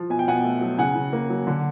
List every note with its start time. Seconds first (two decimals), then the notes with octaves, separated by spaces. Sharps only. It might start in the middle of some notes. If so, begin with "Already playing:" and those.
Already playing: F3
0.10 B2 G#5
0.19 G5
0.28 B2 F#5 G#5
0.44 A3
0.61 F#3
0.78 C#3 F#5 G#5
0.95 C#3
1.13 A#3
1.30 F#3
1.47 D3